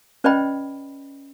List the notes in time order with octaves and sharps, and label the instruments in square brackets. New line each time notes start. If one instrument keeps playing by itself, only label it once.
[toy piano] C#4 B4 D5 D#5 G5 B5